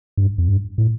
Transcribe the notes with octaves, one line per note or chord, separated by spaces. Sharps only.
G2
F2
G2
A2